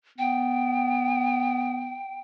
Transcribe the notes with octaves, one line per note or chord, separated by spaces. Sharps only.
B3 G5